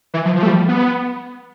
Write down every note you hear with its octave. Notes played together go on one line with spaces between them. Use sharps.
E3
F3
F3
A3
G3
B3